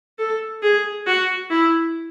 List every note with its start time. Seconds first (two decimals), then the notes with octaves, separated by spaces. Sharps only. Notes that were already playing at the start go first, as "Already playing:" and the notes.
0.19 A4
0.62 G#4
1.07 F#4
1.50 E4